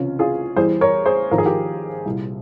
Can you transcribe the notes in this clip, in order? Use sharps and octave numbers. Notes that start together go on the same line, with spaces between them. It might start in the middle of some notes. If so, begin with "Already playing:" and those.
Already playing: C#2 C3 E3 C#4 F4
F4 G#4
E2 E3 G3 G#4 C5
A#4 C#5
G#4 C5
G#1 G#2 F3 A#4
G#4
G4 A#4
C2 A#2 G3